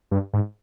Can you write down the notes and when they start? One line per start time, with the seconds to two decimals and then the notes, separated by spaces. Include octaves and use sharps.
0.11 G2
0.33 G#2